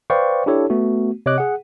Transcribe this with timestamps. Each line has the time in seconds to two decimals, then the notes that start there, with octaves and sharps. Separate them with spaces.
0.10 B4 C5 D5 F5 G5 C#6
0.46 D4 E4 G4 A4 C#5
0.70 A3 B3 F#4
1.26 C3 C#5 D#5 D6 F#6
1.38 G#4 F#5